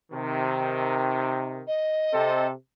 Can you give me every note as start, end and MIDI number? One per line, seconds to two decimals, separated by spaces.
0.12 1.63 48
0.12 1.63 51
1.67 2.46 75
2.13 2.50 48
2.13 2.50 60
2.13 2.50 69